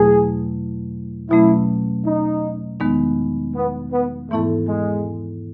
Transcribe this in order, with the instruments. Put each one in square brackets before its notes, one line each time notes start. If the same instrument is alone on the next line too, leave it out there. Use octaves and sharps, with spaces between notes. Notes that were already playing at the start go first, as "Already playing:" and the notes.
Already playing: [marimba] E2 B2 F#3 A3 E4 [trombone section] G#4
[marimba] B2 F#3 A3 C#4 [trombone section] E4
[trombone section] D#4
[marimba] E2 D#3 G#3 B3 D#4
[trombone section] B3
B3
[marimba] G#2 E3 B3 E4 A4 [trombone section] A3
[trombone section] G#3